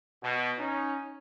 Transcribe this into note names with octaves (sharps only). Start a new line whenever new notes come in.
B2
C#4 D#4